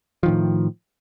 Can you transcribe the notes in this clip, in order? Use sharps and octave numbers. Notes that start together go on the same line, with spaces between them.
A2 D#3 F3